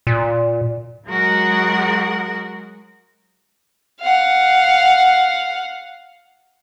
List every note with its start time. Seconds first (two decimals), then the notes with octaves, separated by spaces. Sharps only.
0.07 A#2
1.06 F#3 G#3 F#4 G#4 A#4 F#5
4.00 F5 F#5